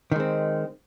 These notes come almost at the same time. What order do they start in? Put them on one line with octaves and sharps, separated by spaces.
D#3 G#3 C4